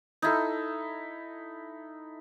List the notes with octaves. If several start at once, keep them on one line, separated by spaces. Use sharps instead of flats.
D#4 E4 A4